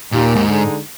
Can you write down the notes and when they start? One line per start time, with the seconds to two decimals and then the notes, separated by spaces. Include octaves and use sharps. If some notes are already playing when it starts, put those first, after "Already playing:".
0.12 D#2 A#2
0.36 G#2
0.49 D3 G#3 D#4